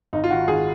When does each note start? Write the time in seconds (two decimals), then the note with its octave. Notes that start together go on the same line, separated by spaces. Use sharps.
0.13 G#1 D#4
0.24 F4
0.30 D#3 F#4
0.48 G#1 G#4